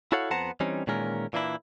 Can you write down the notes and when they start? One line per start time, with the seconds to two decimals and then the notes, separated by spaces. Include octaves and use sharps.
0.12 E4 F#4 A4 C#5 F5 F#5
0.31 F2 B3 C5 F#5 A5 A#5
0.60 E3 G3 C4 C#4 D#4
0.87 A#2 D#3 E3 G#3 C#4 A#4
1.33 A#2 E3 A#3 D4 E4